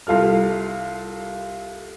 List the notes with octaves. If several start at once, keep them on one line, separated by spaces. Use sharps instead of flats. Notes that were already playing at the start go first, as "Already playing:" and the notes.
C2 F4 A4 F6